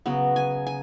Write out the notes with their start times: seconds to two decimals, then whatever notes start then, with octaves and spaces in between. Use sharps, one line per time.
0.06 C#3 F#3 B3
0.36 G#5
0.67 G#5